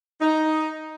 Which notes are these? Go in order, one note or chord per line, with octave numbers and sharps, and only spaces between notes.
D#4